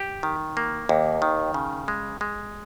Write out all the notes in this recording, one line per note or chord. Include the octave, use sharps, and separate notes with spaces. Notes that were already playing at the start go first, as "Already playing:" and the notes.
Already playing: G4
D#3
A#3
D#2
D#3
C#3
G#3
G#3